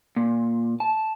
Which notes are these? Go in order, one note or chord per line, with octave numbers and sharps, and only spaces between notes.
A#2
A5